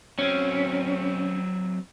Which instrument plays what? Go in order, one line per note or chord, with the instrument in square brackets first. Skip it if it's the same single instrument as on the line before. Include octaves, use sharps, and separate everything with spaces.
[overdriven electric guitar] F#3 C4 [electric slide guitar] C#4